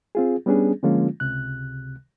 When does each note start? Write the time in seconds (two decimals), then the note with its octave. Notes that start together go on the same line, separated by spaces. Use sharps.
0.15 C4 F4 G#4
0.46 G3 B3 C#4 D4 G#4
0.83 D3 F3 G#3 A#3 C#4 F4
1.20 C#2 C3 F#6